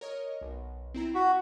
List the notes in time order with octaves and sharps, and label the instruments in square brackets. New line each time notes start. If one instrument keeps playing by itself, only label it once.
[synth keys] A#4 C#5 D#5
B1
C4 E4 A#5
[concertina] F#4 [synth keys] B6